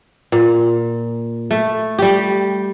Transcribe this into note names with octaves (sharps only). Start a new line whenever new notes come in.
A#2
A3
G3 G4